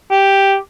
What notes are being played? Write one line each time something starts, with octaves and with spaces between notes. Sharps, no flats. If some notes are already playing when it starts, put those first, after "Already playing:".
G4